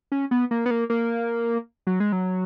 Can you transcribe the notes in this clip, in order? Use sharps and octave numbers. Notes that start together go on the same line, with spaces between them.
C#4
B3
A#3
B3
A#3
A#3
F#3
G#3
F#3